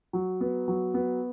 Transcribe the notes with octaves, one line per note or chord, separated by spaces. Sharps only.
F#3
B3
F#3
B3